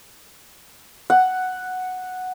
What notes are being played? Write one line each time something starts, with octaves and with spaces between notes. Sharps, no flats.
F#5